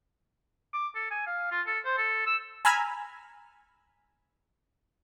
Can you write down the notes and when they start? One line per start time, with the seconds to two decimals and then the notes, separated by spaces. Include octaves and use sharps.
0.74 D6
0.95 A4
1.11 G#5
1.26 F5
1.51 F4
1.67 A4
1.85 C5
1.98 A4
2.26 E6
2.65 G#5 A#5 B5 E6 F6 G#6